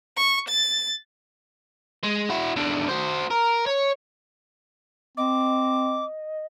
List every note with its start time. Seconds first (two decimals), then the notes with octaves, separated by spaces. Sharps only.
0.17 C#6
0.49 A6
2.04 G#3
2.30 E4 F#4
2.56 E2 D3
2.88 F#4 C5
3.30 A#4
3.67 C#5
5.17 C4 D#5 D6